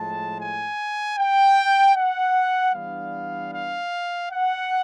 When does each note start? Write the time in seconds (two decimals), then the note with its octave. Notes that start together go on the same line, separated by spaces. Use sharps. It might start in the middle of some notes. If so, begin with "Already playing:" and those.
Already playing: A2 F3 G#3 A5
0.39 G#5
1.18 G5
1.96 F#5
2.74 E3 G3 B3 D4 F5
3.52 F5
4.31 F#5